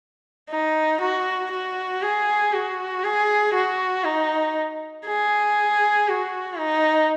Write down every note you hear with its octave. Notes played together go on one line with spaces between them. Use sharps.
D#4
F#4
F#4
G#4
F#4
G#4
F#4
D#4
G#4
F#4
D#4